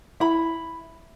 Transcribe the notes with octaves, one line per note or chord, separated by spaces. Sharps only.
E4 B5